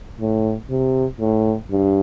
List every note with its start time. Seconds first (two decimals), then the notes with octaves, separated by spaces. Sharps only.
0.20 A2
0.70 C3
1.20 A2
1.71 G2